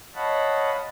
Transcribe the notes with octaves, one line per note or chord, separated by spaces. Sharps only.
C#5 D#5 F5 F#5 A5 B5